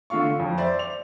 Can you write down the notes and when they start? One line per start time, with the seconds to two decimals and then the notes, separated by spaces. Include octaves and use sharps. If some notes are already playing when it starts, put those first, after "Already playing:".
0.10 D3 A3 F4 F5 C#6
0.39 F2
0.58 C5 D5 E5
0.79 F7